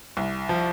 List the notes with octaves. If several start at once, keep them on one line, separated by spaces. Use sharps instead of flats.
C2
F3